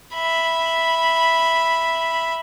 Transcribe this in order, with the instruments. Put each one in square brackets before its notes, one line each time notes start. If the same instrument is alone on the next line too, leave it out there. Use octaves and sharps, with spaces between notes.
[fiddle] E5 B5